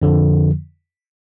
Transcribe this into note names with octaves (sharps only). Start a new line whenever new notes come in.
F2 D3 F3